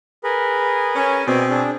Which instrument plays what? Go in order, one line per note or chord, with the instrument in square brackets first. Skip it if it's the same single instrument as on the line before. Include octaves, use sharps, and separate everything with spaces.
[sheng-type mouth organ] G#4 A#4 B4
[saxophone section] C#4
[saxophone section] B2 C4 [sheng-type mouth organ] D5 G#5
[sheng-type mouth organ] D4 G#4